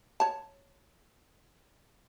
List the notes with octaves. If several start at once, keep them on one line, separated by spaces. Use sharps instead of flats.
C#5 A5